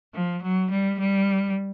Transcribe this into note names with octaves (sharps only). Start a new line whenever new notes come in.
F3
F#3
G3
G3